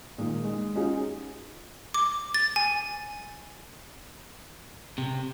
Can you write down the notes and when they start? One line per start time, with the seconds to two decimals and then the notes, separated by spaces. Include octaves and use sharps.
0.18 A#2 D#3 G#3
0.45 G#3
0.75 C#4 D#4 F4 F#4 G#4
1.94 D6
2.34 A6
2.56 G#5
4.98 C3